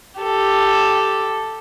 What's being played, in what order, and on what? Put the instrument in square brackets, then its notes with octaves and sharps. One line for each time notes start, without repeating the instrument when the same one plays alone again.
[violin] G4 A4